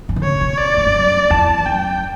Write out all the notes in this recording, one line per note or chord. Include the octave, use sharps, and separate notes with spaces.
A2
B2
C#3 C#5
B2
D5
A2
G2
F#2
E2 A5
F#2 G5